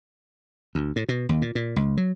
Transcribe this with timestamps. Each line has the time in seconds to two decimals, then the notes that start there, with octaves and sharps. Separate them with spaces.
0.75 D2
0.96 A2
1.09 B2
1.29 D#2
1.42 A#2
1.55 A#2
1.76 C#2
1.97 F#3